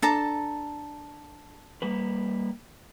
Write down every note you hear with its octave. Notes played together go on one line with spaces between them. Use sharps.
D4 A4 A5 A#5
G3 A#3 B4